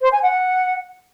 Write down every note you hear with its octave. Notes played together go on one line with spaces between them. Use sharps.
C5
G#5
F#5